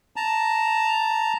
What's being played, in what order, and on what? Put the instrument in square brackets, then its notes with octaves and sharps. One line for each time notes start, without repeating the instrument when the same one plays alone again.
[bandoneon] A5 A#5